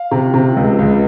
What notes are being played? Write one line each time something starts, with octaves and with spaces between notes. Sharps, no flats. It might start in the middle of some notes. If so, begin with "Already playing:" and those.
Already playing: F5
C3
C3
C#2
C#2